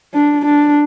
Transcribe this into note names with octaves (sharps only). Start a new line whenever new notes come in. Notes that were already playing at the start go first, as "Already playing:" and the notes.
D4
D4